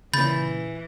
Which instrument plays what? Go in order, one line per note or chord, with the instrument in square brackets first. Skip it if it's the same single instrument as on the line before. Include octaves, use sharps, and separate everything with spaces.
[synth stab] A#2 C#3 [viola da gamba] E3 [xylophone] B5 G6 A6